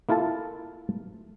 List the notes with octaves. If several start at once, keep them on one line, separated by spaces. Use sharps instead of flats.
A#3 E4 F4 A4 A5